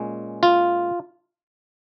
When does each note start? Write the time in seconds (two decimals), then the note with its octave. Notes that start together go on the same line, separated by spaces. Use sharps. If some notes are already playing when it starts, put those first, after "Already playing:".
Already playing: A#2 G#3 C#4
0.43 F4